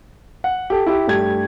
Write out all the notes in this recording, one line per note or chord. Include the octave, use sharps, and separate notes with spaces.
F#5
G4 A4
E4 G4
G2 A3 G4 G#6